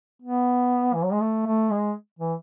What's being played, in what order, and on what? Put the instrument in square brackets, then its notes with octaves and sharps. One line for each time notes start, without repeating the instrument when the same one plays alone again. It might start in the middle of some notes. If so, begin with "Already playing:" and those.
[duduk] B3
E3
F#3
G#3
A3
A3
G#3
E3